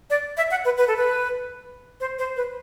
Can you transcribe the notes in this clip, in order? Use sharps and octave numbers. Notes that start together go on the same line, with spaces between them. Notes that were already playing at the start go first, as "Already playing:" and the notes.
D5
E5
F#5
B4
B4
A4
B4
C5
C5
B4